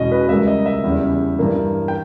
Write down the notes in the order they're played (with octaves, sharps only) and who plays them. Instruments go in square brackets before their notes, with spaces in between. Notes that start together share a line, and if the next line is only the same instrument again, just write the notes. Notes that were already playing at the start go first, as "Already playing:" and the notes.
Already playing: [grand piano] E2 B2 G#3 C#4 D#5
B4
C#2 C#3 G3 A#3 E5
D#5
E5
E2 C#3 G3 C#4
G2 E3 A#3
G5